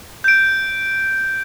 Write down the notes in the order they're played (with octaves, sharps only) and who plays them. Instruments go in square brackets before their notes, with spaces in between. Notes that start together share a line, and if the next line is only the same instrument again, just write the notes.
[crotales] G6 D7